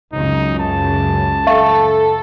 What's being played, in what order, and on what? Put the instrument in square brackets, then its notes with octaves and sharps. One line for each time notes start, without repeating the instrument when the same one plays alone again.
[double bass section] C#2 F#2 C#3 [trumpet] D#4
[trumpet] A5
[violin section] A4 [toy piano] E5 F5 C#6